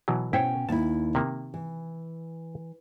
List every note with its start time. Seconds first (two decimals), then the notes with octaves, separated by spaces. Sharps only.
0.08 B2 E3 F#3
0.33 B2 C#4 E4 C5 C#5 G5
0.69 D#2 E4 A5
1.15 C3 D#3 A#3
1.54 E3